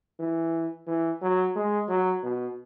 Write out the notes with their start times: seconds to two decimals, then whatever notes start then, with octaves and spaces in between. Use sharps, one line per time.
0.20 E3
0.87 E3
1.22 F#3
1.56 G#3
1.89 F#3
2.23 B2